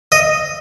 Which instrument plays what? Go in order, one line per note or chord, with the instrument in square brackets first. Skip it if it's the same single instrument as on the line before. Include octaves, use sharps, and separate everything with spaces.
[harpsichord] D#5